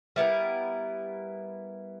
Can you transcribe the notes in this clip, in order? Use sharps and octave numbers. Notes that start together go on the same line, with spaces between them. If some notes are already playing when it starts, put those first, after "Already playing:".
G3 B3 E4 A#4 E5